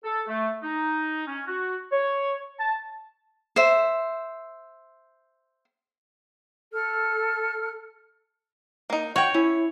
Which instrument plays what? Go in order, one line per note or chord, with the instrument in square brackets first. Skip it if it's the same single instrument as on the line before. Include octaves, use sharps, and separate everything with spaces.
[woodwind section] A4
A3
D#4
C#4
F#4
C#5
A5
[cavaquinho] C5 E5
[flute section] A4 F6
[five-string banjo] A#3 D#4
[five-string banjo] F#4 G5 [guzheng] C#5
[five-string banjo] C#4 [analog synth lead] E4